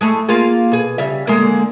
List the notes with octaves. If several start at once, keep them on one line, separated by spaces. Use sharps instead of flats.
G#3 A3 E4
A#3 F4 G#4
B2 G#4
C#3 G3 E5
D3 G#3 A#3